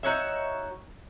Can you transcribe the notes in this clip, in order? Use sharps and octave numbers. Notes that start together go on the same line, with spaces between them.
D#4 F#4 C#5 E5